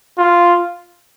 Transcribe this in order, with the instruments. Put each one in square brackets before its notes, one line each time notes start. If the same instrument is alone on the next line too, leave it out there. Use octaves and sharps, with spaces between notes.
[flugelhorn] F4